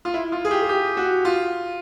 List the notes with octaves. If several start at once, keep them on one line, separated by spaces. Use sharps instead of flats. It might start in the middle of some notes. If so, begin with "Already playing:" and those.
F4
E4
F4
G#4
G4
G#4
G4
F#4
F4